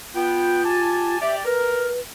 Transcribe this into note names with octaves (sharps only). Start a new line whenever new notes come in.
B3 F4 G5
G4 G#5 A5
G4 D5 E5
A#4 B4